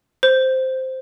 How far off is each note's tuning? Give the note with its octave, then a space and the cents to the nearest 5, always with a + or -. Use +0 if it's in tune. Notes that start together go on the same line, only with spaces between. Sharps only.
C5 -5